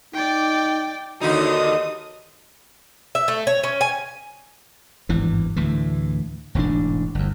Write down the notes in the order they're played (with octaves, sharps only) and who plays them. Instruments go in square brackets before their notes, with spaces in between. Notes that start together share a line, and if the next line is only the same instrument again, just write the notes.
[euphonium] D#4 [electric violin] D5 G5
[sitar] D#2 D3 D#4 [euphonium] F#4 [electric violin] D#6
[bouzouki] E5
A3
C#5
C#4
G#5
[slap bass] G#1 E2 G2 E3
D2 A2 E3
E1 A1 G#2 D4
G1 E2